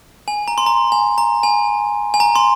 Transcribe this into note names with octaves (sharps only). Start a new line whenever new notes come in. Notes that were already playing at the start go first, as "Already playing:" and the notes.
G#5
A#5
C6
A#5
G#5
A#5
G#5
G#5
A#5
C6